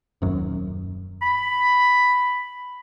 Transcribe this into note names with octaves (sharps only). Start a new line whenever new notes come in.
D#1 F#2
B5